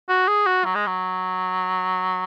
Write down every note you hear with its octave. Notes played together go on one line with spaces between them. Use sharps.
F#4
G#4
F#4
F#3
G#3
F#3